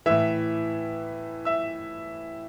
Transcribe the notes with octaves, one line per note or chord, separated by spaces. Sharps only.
A2 E3 E5 E6
E5 E6